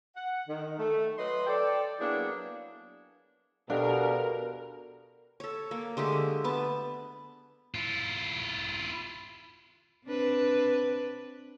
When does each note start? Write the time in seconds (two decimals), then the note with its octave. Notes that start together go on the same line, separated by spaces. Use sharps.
0.16 F#5
0.48 D#3
0.79 A3
1.18 F#3 B4 D#5 C6
1.47 A4 D5 G5
2.00 F#3 A#3 B3 D4 E4 G#4
3.70 B2 D4 G4 A4 A#4 F5
5.40 A4 C#5
5.71 A#3
5.97 D3 G#3 A3 G4
6.44 B3 A5
7.74 E4 F4
10.05 C4 D4 B4